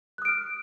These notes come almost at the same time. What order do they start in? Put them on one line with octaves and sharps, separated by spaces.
F#6 D#6 D7 F6